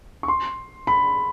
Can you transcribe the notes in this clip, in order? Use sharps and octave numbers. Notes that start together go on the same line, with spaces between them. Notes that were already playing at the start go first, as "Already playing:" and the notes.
C#6
C6
B5